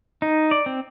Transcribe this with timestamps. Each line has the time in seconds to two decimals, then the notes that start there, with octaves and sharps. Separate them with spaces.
0.22 D#4
0.51 D5
0.66 C4